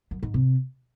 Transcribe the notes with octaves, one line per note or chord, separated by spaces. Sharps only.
F#2
G#2
C3